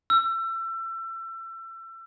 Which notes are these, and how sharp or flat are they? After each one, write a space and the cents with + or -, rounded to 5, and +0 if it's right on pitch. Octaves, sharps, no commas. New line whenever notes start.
E6 +30